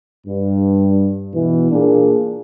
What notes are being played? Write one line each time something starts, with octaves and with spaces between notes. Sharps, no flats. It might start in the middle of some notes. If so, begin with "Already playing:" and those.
G2
B2 E3
A#2 A#3 D4 G#4